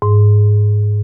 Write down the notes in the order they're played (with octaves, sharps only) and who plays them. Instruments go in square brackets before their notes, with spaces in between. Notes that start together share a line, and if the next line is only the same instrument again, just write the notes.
[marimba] G#2